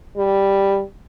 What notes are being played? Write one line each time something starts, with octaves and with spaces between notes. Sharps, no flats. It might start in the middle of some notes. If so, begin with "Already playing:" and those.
G3